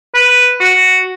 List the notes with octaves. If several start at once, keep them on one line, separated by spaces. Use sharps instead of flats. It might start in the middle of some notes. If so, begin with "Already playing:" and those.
B4
F#4